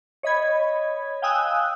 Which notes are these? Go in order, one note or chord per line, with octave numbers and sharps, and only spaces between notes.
C#5 D#5 B5 G#6
F5 G5 G#5 D#6 E6 F#6